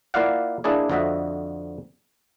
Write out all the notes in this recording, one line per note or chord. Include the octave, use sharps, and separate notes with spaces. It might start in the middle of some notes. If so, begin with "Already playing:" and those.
A#3 E4 F4 D5 F5 F#5
A#3 D4 E4 G#4 D5
F2 D3 F3 F#4 D#5 E5